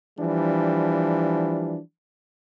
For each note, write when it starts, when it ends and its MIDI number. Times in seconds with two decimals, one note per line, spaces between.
0.19 1.78 52
0.19 1.78 53
0.19 1.78 55
0.19 1.78 62